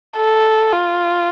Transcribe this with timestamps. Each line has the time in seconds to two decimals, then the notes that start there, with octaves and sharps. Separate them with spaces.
0.16 A4
0.72 F4